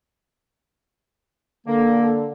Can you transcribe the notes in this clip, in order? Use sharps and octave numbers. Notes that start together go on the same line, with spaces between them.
D3 A#3 A4